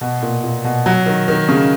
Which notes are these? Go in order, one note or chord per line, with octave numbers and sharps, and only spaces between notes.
B2
A#2
A#2
B2
F#3
D#3
D#3
C#3